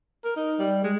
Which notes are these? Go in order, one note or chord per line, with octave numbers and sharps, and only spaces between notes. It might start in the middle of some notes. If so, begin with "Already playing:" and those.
A#4
D#4
G3
G#3